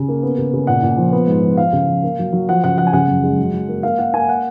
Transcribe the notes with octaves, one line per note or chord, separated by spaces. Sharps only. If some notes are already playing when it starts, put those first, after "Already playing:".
Already playing: C#3
A#3
B3
C#3
C#3
A#2 F#5
A#2
F3
B3
G#2
F3
F3 F5
C#3
F3
A#3
F#3
F#3
F3 F#5
C#3 F#5
F3 F#5
G#5
C#3 F#5
F#2
G#3
F#3
F#3
A#3
A#3 F5
A#3 F#5
A#3 G#5
F#5